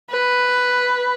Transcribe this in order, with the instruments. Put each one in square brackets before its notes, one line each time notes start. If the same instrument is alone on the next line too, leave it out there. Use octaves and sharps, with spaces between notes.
[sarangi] B4